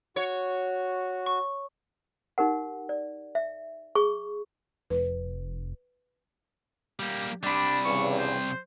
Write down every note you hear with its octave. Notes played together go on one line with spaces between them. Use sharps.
F#4 C#5
C#6
D#4 G4 A#4 F#5
D5
E5
G#4 C#6
F1 B4
G3 A#3 G4
C3 G3 D4 D5 B5
E2 G2 C#3 C#6
C5